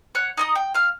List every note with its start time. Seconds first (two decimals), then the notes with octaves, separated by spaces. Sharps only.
0.15 C#5 F#5 F#6
0.37 D#4 D#5 D#6
0.55 G5
0.74 F5 F6